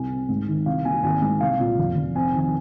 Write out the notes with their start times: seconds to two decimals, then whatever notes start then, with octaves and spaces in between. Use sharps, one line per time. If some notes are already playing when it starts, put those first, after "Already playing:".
Already playing: C2 G#5
0.10 C4
0.29 G#2
0.48 D#3
0.66 C2 F5
0.85 A#3 G#5
1.03 G#1 G#5
1.22 G#2
1.41 C2 F5
1.60 A#2
1.78 F1
1.96 F1
2.15 C4 G#5
2.34 D#3
2.40 G#5